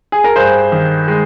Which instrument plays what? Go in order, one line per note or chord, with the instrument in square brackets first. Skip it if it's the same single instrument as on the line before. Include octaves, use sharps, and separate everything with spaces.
[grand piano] G#4
A#4
G2 G#4 C5
D#3
G#3